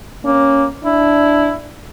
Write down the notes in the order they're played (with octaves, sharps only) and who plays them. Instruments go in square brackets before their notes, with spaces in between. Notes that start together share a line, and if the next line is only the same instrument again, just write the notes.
[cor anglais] A#3 [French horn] C#4
[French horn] D4 [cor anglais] E4